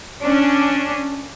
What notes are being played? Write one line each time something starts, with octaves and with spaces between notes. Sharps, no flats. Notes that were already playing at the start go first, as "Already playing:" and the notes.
C#4 D4